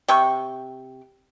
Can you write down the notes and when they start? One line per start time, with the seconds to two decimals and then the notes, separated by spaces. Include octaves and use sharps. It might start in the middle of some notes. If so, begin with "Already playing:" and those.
0.08 C3 G5 C#6